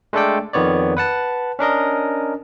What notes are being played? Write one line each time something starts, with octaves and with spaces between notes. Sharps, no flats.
G#3 A3 D4 A4 D5 G5
F2 D#3 B3 C#5 D5
B4 F#5 A5
C#4 D4 A#4 D#5